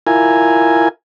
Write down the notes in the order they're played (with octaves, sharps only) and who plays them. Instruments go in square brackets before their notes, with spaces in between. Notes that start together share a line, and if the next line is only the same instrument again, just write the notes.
[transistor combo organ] E4 F4 A#4 G#5